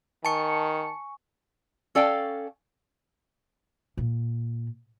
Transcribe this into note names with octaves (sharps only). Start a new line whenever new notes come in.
D#3 G#5 A5 C#6 C#7
C#4 A4 D5 F5 G5
A#2